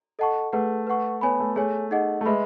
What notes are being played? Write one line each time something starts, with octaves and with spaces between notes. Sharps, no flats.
A4 D#5 F#5 A5 C#6
A3 G#4 B4 F#5
B4 F#5 C#6
B3 C#5 G#5 B5
A3
A3 G#4 C#5 G#5
D#4 G#4 D#5 F#5
A3
G#3 G#4 B4 E5 B5